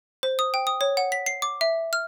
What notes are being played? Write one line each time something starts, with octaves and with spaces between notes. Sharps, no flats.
C5
D#6
G5
D#6
C#5
F#5
B6
C7
D6
E5
F6